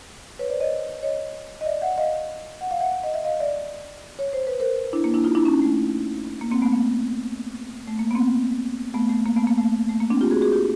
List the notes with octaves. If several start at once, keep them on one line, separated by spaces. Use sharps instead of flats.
B4 C#5
C5 D5
C#5 D#5
C#5 D#5
D#5
D5 E5
E5 F#5
D#5 F5
F#5
F5
E5 F#5
D#5
E5
D#5 F5
D5 E5
C#5
C5
B4
A#4 C5
D4 E4
A#3
D4 E4
D#4 F4
D4 E4
C#4 D#4
A3
A#3
A#3 C4
A3 B3
A#3
A3
A#3
B3
A#3 C4
A3 B3
A3
A#3
A3 B3
A#3
A3
A3
A#3
C4 D4
F4 G4
F#4 G#4
F#4 G#4
F4 G4